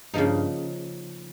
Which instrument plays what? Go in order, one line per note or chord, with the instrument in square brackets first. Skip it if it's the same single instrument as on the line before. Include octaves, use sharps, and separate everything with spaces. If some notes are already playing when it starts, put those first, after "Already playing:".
[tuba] G2 [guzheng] C#3 F3 A#3 D#4